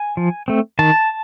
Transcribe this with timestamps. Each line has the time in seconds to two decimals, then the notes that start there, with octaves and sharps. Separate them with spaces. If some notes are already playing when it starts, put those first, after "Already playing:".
Already playing: G#5
0.17 F3
0.48 A3 C4
0.79 D#3 A5